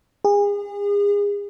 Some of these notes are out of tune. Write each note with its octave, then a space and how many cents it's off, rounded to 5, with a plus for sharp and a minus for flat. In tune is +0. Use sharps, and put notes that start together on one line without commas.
G#4 -35